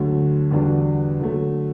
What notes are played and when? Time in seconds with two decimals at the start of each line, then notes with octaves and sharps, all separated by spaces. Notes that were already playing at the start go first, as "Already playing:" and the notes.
Already playing: D2 D3 F#3 A3
0.51 E2 D3 G3 D4 F#4
1.20 D3 F#3 A3